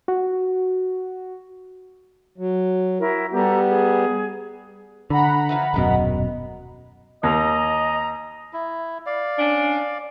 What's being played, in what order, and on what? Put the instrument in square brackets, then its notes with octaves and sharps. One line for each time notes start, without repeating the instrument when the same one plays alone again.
[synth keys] F#4
[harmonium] F#3
[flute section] E4 F#4 A#4
[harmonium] G3 B3 [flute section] G4 A4 A#5
[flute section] G#4
[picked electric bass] D3 [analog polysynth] F#5 A#5 B5
[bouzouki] E3 F3 F5
[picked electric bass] D#1 F#2 B2 [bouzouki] D#3 G#3
[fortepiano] D#2 [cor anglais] D#5 [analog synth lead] A#5
[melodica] E4
D5 F5
[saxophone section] C#4 D4